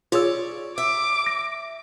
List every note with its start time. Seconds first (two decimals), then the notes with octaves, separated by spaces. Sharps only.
0.12 F4 G#4 C#5 D5 E6
0.78 E5 D6
1.26 A#6